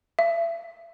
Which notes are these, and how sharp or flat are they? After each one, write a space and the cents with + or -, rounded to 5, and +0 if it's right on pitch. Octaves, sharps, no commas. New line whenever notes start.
E5 +35